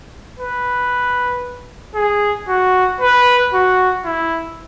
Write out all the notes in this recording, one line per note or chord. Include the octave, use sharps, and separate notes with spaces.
B4
G#4
F#4
B4
F#4
E4